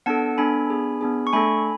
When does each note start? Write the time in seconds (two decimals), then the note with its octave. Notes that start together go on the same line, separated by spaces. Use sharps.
0.06 B3 D4 A4 F#5 A5
0.38 B3 D4 A4 G#5 B5
0.70 B3 D4 G#4
1.01 B3 D4 G#4
1.27 C#6
1.33 A3 D4 A4 G#5 B5